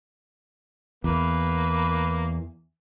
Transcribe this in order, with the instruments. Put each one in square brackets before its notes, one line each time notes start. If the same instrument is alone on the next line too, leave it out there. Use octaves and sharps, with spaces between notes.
[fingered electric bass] E2 [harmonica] A#3 B4